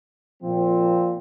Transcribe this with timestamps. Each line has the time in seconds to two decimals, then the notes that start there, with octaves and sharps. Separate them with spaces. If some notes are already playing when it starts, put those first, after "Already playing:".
0.43 A#2 F3 C4